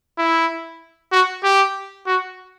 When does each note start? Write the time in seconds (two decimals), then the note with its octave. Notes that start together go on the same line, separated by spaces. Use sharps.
0.18 E4
1.12 F#4
1.44 G4
2.07 F#4